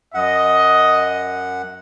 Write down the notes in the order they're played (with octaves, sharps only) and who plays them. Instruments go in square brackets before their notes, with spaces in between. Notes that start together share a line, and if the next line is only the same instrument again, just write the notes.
[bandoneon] F#2 F#5 [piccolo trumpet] D#5